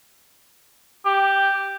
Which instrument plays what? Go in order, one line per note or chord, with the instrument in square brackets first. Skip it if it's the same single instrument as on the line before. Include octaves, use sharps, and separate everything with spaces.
[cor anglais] G4